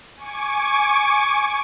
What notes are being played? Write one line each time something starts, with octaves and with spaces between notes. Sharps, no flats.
G#5 C#6 D6